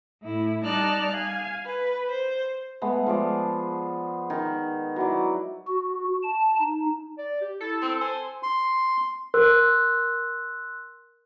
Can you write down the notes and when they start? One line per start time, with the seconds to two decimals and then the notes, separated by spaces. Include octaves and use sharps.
0.22 A2 E4
0.63 G3 D#4 D5 A5 F6 F#6
1.11 F5 G#5
1.66 B4
2.09 C5
2.82 G#3 A3 B3
3.07 F3 G#3 D5
4.30 D#3
4.96 F#3 E4 D5
5.67 F#4
6.23 A5
6.59 D#4
7.18 D5
7.41 G4
7.60 E4 A4
7.82 C4
8.01 C5 G#5
8.43 C6
9.34 A#4 C6 E6 F#6